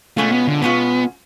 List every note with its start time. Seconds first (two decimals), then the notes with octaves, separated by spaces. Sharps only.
0.17 B2 G#3 A3 C#4 F4
0.32 B3
0.48 D3
0.62 B2 G#3 B3 C#4 F4